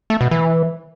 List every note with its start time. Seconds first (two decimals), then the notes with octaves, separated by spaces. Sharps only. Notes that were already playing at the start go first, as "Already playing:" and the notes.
0.10 A3
0.21 B2
0.31 E3